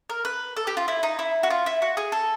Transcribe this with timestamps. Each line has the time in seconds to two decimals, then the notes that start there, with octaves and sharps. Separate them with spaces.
0.10 A#4
0.25 B4
0.57 A4
0.67 G4
0.77 F4
0.88 E4
1.03 D#4
1.19 E4
1.43 F#4
1.50 F4
1.66 E4
1.82 F#4
1.97 G#4
2.12 A4